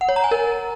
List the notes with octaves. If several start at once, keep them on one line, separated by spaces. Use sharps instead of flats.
F#5
C#5
A#5
G#5
A#4